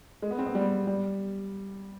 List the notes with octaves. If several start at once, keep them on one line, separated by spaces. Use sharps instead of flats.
G#3
B3
C4
B3
G3
G3